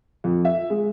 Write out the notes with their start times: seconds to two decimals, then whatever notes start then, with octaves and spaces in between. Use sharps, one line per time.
0.24 F2
0.45 E5
0.70 G#3